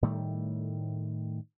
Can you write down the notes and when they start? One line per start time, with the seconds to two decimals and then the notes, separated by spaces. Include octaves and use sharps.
0.02 A2 D#3 G3 A3